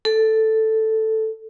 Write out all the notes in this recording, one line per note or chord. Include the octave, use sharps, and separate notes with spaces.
A4